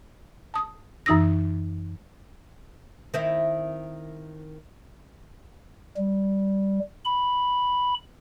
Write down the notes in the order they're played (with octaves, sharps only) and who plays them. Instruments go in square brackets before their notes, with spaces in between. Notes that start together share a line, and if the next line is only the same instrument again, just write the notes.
[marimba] A5 D#6
F#2 E3 D#4 D#6 E6 A#6
[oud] D#3 C4 E4
[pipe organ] G3
B5